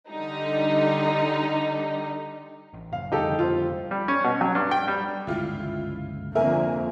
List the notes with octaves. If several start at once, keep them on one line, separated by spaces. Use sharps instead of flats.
D3 G3 D#4
A1
F#1 F5
F2 D3 G3 D#4 G4 A4
F4 C5
G3
C#4
B2
F#3
G2
G5
G3
G1 C#2 G#2 E4 F4
F2 D3 A#3 A#4 E5 G#5